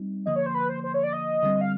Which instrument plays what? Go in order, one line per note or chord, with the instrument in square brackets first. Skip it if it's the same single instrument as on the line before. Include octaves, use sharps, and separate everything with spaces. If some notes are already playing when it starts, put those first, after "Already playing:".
Already playing: [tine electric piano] G3 C4 D#4
[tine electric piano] D3 F3 A#3 [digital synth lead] D#5
[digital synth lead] C#5
C5
B4
C5
C5
C#5
D5
D#5
[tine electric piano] D3 G3 C4
[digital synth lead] F5